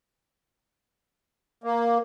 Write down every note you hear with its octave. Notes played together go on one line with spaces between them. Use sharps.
A#3